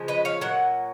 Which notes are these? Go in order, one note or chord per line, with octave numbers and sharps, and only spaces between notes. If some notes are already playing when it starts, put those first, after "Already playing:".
Already playing: C#3 F3 G#3
B4 D#5
C#5 F5
A#2 F#3 F#5